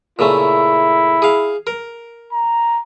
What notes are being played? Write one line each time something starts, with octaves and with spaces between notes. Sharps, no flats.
A#2 C#3 A3 E4
G#4 F5
A#4
A#5